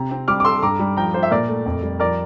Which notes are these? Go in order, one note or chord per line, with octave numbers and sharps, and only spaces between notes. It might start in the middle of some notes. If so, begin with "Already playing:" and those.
Already playing: C3 A#5
C4
G3 D6 F6
D6
A4 C6 E6
G2 A#5 D6
G3
F3 G5 A#5
F4 C5
E5
A#2 A#4 D5
A3
F2
G3
F3 A#4 D5